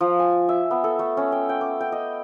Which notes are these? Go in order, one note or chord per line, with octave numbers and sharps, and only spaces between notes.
F3
G#5
E5
B3
A4
A3
C#4
G5
G5
D6
G5
D#5